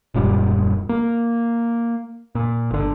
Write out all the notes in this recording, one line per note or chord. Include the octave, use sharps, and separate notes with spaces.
D#1 F#2 A#2 G3
A#3
A#2
G1 D3